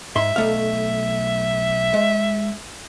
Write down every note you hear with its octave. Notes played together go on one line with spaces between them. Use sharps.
G#2 E5 C6
B1 A3 F5
G#3